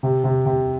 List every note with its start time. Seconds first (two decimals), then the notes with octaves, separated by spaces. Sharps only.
0.03 C3
0.24 C3
0.46 C3